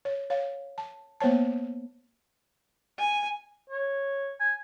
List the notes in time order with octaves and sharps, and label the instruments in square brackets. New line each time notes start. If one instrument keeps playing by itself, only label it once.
[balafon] C#5
C#5 F5
A5
A#3 B3 C5 C#5 A5
[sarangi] G#5
[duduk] C#5
[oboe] G#5